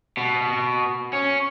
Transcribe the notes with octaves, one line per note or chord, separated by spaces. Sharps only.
B2
C#4